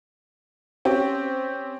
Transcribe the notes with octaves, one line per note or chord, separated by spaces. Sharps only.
C4 C#4 G4